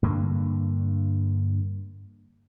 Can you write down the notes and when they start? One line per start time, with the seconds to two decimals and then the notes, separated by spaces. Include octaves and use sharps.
0.03 G2 D3 A#3